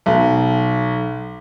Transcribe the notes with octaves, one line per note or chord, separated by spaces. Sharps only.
B1